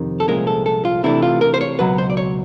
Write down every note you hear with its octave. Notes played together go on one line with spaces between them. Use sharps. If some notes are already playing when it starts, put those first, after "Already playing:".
Already playing: F2 C3 D#3
A4
C2 A#2 F3 G#3 C#4 A#4
A4
A4
F4
C3 E3 A3 D4 E4
F4
A#4
C5
C#5
C#2 B2 F#3 B4
C5
D5
C#5